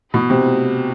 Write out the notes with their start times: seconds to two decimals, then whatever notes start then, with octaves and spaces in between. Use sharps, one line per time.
0.14 B2
0.30 C3